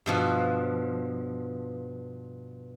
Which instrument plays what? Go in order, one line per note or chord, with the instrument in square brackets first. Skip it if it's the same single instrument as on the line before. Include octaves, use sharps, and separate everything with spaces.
[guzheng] G2 B2 F3